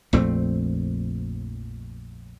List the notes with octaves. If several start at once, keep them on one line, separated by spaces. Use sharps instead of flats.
A#1 F2 A3 C4